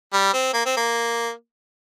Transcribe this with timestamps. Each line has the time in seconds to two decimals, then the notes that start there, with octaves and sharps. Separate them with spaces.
0.13 G3
0.33 C4
0.53 A#3
0.66 C4
0.77 A#3